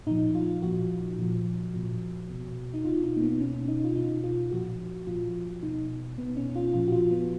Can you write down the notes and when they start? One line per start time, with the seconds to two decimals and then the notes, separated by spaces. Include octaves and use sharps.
0.07 A#2 F3 D#4
0.35 F4
0.62 A#2 F3 F#4
1.18 A#2 F3
1.74 A#2 F3
2.29 B2
2.74 D#4
2.85 B2 F4
3.03 D#4
3.17 A#3
3.22 B3
3.40 B2 C#4
3.68 D#4
3.84 F4
3.95 B2 D#4
4.24 F4
4.51 A#2 F3 F#4
5.07 A#2 F3 F4
5.63 B2 D#4
6.18 B2 B3
6.37 C#4
6.55 F4
6.74 A#2 F3 F4
6.88 F#4
6.92 F4
7.11 B3